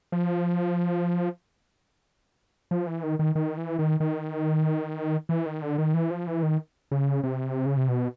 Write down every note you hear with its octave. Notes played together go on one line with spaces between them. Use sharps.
F3
F3
E3
D#3
D#3
D#3
E3
D#3
D#3
E3
D#3
D3
D#3
E3
F3
E3
D#3
C#3
C3
C#3
C3
B2